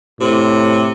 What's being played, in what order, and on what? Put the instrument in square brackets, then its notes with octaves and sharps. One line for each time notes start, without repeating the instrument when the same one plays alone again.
[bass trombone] A2 [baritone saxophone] C3